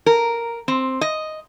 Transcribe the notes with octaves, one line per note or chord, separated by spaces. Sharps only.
A#4
C4
D#5